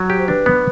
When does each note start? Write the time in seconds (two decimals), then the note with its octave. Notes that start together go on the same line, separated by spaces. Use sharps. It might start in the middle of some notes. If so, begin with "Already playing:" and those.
Already playing: F#3
0.08 G4 C#5
0.18 C5
0.28 D4 B4
0.46 B3